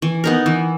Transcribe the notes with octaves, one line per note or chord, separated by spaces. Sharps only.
E3
B3 D#4 A#4
E3